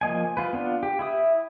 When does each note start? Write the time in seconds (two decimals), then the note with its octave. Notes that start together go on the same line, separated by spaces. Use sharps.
0.01 F3 A#3 D#5 G#5
0.37 F4 B4
0.53 B3 D4 F4
0.83 G4
0.99 E4 E5 D#6